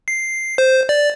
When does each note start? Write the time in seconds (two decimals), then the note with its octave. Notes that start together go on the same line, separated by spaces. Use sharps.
0.08 C7
0.58 C5
0.89 D5